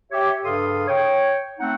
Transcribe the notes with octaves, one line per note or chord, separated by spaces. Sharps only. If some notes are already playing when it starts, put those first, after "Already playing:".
G4 C#5 E5
G2 C#3 A4 F5 C6 D#6
C#5 G5
A3 C4 D#4 F#5